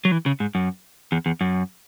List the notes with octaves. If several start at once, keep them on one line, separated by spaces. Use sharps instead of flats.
F#3
E3
C#3
G#2
F#2
E2
E2
F#2